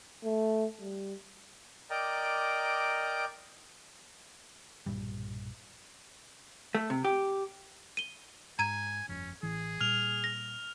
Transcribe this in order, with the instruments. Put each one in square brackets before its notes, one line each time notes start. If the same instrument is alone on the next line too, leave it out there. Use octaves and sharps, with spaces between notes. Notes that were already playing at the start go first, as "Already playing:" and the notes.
[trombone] A3
G3
[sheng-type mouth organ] A#4 D5 D#5 G5 A#5 D6
[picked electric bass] B1 G2 A#2 G3
[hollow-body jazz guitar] A3
C3
G4
[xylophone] D#7 G7
[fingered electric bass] G#2 [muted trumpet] G#5 [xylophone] A#5 G#6 D#7
[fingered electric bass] G1 F2 [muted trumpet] C#4
[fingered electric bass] A1 E3 [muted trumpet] G#4
[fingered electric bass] A#2 G3 A#3 [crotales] F6 F7
[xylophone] A#6